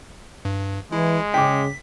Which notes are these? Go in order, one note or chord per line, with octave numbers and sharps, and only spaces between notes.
G2
E3 G#3 E4
C#3 G5 D6 B6